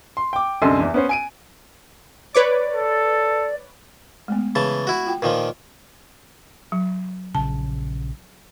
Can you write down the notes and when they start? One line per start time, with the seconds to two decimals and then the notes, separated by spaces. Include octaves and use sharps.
0.17 C6
0.33 G5 D6
0.62 C2 F#2 D3 A4 D#5 C6
0.79 E2 E3
0.94 B3 C#4 C5
1.09 G#5 D7 D#7
2.35 B4 C#5 D5 D6
2.74 A4
4.28 G#3 A3 B3
4.55 C#3 E3 A5
4.87 E4 F#4
5.07 F4 G5
5.22 A#2 D#3 F3 F4 B4
6.72 F#3
7.35 A#1 C#3 A5